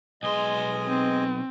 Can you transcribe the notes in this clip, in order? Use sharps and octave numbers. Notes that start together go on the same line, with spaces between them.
B1 G#3 D#5 G#5 C6
C4